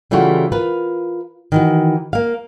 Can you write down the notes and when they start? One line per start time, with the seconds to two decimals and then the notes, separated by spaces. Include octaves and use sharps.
0.11 C#3 E3 G3 A3 F4 F#4
0.52 F4 A#4 B4
1.52 D#3 E3 F#4
2.13 A#3 F5